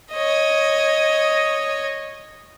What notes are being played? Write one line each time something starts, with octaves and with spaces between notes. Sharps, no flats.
C#5 D#5